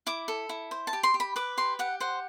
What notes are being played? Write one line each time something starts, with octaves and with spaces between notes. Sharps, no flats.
E4 D6
A4
E4
C5
A5
G4
C6
G4
B5
B4 D6
G4 C6
G4 F#5
C5 F#5